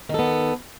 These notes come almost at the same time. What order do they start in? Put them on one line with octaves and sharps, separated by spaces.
D#3 A4 B3